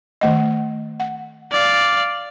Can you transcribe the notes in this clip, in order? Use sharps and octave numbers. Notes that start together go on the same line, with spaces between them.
D#3 A3 D#5
F#5
D5 F5